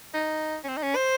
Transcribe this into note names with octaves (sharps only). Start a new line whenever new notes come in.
D#4
C#4
C4
D#4
C#4
C5